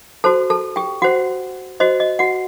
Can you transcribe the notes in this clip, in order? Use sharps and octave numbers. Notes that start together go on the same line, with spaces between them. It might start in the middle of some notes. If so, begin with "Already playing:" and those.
F#4 A4 C5 A5
A4 A5
G4 G5
F#4 C5 F#5
F#4 C5 D#5
D#5
F#4 F#5